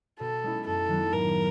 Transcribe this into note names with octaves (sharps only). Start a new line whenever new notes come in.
B2 A4
G#3 C#4 E4
F#2 A4
D#3 F#3 B3
A2 A#4